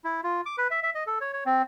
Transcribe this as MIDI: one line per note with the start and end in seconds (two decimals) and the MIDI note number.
0.04 0.21 64
0.24 0.41 65
0.46 0.56 86
0.58 0.68 71
0.71 0.80 76
0.83 0.90 76
0.95 1.04 75
1.07 1.18 69
1.21 1.32 73
1.33 1.44 73
1.46 1.62 60